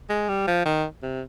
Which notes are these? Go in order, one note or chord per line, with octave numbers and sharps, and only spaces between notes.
G#3
G3
F3
D#3
C3